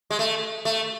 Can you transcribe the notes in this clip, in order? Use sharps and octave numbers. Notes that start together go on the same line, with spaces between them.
G#3
A3
A3